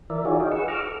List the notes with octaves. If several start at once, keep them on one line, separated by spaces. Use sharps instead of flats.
E3 A#4 D5 E5
D#4 F4 F#4 G#4 C#5 D5
D#4 C#5 D#5 F5 G5
G#4 B4 F#5 C#6 E6
A#5 C#6 D6 E6 F6
A4